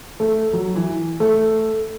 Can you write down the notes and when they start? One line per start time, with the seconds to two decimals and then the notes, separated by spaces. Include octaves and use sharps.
0.20 A3
0.53 F#3
0.76 E3
1.20 A3